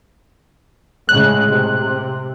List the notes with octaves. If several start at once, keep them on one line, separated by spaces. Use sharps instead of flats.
A2 C#3 G#3 F#6
C3